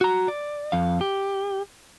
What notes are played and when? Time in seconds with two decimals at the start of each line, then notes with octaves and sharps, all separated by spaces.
0.01 F#4 A#5
0.28 D5
0.72 F2 F5
1.01 G4